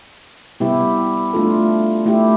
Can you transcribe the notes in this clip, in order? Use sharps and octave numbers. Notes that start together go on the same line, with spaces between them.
C3 G3 B3 E4 G4
A3 D4 F4 A4
A3 E4 G4